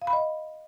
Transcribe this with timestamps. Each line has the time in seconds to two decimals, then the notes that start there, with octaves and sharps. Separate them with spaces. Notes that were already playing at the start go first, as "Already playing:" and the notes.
0.02 F5
0.07 B5
0.13 D#5